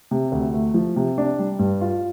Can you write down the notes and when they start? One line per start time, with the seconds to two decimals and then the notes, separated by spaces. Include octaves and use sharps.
0.11 C3
0.32 D2
0.54 A3
0.74 F3
0.96 C3
1.18 D4
1.39 G3
1.59 G2
1.81 F4